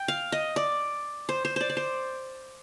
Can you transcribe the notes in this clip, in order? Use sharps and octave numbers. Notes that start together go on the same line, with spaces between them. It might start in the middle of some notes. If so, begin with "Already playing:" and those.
Already playing: G5
F5
D#5
D5
C5
C5
C5 D5
D5
C5